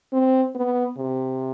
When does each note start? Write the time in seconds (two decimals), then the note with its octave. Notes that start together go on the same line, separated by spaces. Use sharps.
0.13 C4
0.55 B3
0.97 C3